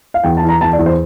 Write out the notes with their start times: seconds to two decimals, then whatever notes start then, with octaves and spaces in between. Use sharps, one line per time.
0.14 F5
0.24 E2 G5
0.37 A5
0.43 E3
0.49 A#5
0.61 E2 A5
0.73 D5
0.79 E2
0.86 C5